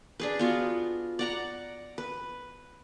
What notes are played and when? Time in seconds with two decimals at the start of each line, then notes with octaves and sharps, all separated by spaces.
0.20 D4 G#4 B4
0.39 B3 F4 F#4
1.19 D5 F#5 A#5
1.98 B4